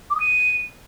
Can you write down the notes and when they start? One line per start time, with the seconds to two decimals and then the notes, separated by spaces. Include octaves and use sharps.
0.10 D6
0.15 D#6
0.20 D#7